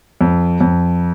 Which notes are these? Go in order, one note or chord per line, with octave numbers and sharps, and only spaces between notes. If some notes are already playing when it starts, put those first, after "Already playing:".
F2
F2